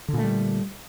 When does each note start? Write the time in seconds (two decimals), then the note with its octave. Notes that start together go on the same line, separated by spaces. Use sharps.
0.08 D3
0.13 A#2
0.18 A3
0.23 G3